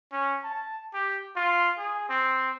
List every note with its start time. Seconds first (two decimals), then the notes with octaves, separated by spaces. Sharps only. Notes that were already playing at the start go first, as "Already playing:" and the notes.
0.12 C#4
0.44 A5
0.94 G4
1.36 F4
1.78 G#4
2.09 C4